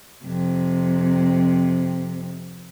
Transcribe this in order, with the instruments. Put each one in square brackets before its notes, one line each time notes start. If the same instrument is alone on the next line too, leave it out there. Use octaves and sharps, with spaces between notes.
[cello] F2 C3